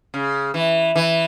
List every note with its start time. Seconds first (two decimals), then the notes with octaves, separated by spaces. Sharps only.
0.14 C#3
0.54 E3
0.96 E3